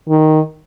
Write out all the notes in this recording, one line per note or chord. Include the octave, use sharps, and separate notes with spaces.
D#3